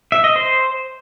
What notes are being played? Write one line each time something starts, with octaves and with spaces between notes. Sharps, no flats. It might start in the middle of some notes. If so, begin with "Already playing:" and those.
E5
D#5
C5